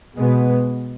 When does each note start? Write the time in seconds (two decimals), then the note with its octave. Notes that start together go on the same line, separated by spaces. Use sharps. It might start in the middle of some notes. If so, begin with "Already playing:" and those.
0.15 B2 G#3 B3